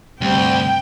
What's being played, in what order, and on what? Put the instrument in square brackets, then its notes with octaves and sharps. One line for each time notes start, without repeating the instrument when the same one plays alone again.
[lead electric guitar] D2 [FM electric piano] G2 C3 C4 [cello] G5